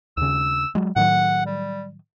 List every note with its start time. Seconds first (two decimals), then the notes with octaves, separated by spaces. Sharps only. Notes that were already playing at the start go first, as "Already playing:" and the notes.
0.17 D#2 C#3 E6
0.75 F#3 G#3
0.96 A2 D#3 F#3 F#5
1.46 G3